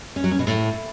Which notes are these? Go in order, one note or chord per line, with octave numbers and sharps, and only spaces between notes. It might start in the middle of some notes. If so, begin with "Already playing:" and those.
C#4
F#3
C#4
B2
A2